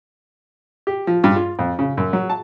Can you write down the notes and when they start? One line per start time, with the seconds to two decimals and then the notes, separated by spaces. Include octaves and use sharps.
0.87 G4
1.07 F3
1.24 G2
1.36 F4
1.59 F2
1.79 C#3
1.97 F#2
2.13 F#3
2.30 A5